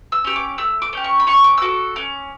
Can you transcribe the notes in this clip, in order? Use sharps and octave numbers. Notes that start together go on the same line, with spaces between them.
E6
C#4 G4 E6
D6
A3 E6
D6
C#4 G4
C#6
B5
C#4 C#6
D6
E6
F#4 A4 D6
C#4 D6